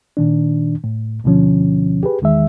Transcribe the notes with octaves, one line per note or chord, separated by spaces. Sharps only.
A#2 D#3 D4
A2
D2 B2 D3 F3 C#4
G4 G#4 B4
E2 D#3 G#3 E5